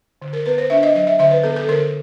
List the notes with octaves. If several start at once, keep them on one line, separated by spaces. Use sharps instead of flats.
D3
A#4
B3 B4
C5
D4 E5
D#5
F#3 D#5
E5
D3 E5
B4
B3 A4
A4
D3 A#4